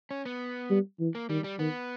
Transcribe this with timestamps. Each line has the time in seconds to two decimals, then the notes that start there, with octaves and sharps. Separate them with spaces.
0.11 C#4
0.26 B3
0.71 G3
1.00 E3
1.15 A#3
1.30 D#3 G3
1.44 G3
1.59 D#3 B3